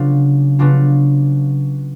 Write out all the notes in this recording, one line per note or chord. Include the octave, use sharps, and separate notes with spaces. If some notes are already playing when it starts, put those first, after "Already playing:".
Already playing: C#3 F#3 B3 D4 F4
C#3 F#3 B3 D4 F4